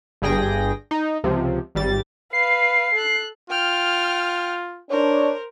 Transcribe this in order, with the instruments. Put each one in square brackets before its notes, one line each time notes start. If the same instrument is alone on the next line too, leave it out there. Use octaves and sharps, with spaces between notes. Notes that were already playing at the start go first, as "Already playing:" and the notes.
[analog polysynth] G1 G2 G#4 G5 A#6
D#4
C#2 C3 F3
G#1 G3 A6
[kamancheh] B4 F5 [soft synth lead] C7
[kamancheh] A4 F#6
[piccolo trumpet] F4 [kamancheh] G5 F6
[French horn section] D4 C#5 [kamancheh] A#4 C5